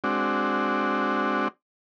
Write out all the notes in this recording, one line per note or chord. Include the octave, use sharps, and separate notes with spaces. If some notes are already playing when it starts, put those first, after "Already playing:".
G#3 C4 D4 F#4